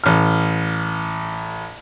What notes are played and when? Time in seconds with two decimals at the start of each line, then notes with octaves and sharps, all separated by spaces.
0.04 A1 F6